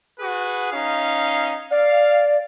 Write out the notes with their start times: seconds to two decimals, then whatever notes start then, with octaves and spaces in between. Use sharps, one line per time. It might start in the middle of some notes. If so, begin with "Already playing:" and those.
0.20 F#4 G#4 B4
0.72 C#4 D#4 F5
1.71 D5 F5